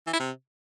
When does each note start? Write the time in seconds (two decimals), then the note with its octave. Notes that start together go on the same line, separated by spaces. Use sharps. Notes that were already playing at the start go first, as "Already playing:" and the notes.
0.07 E3
0.13 E4
0.19 C3